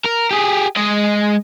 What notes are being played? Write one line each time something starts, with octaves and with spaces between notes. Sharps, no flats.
A#4
G4 G#4
G#3 D#5